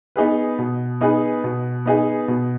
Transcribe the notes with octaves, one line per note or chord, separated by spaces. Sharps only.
B3 D#4 G#4 B4
B2
B3 D#4 G#4 B4
B2
B3 D#4 G#4 B4
B2